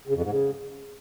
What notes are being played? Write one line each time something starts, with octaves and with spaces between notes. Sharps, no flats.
C#3
F2
G#2
C#3